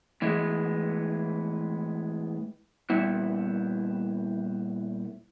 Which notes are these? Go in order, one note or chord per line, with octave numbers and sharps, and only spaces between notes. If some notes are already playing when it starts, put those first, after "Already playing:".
A2 E3 G#3 B3
A#2 G3 B3 E4